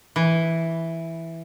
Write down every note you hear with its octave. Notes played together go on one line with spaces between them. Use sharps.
E3